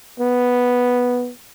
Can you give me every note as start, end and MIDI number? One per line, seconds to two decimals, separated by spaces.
0.20 1.31 59